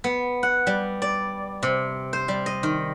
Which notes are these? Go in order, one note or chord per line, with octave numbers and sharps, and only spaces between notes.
B3
F#5
G3
D5
C3
C5
G3
D#5
D#3